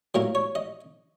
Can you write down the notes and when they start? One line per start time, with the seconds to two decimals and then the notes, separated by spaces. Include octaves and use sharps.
0.15 A2 F#3 A#3 A#4
0.35 C#5
0.55 D#5